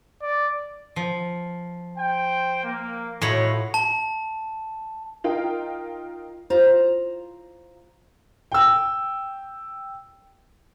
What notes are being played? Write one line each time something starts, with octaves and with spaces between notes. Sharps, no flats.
D5
F3
C5 G5
A#3
A2 D#4 F4 F#4 C#5 B5
A5
D#4 F4 A#4 G5
F4 C5 A#5
G5 E6